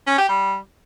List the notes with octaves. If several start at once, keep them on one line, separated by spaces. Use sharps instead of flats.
C#4
G4
G3